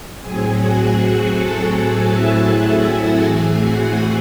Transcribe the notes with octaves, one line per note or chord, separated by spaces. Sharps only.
A2 F#3 C4 G#4 G#5
F#4 F#5
F#4 F#5
A4 A5
G#4 G#5
E4 E5
E4 E5
F#4 F#5
A2 E3 A3 C4 G#4 G#5
F#4 F#5